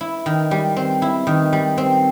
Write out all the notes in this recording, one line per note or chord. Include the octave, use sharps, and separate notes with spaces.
E4
D#3
G3
C4
E4
D#3
G3
C4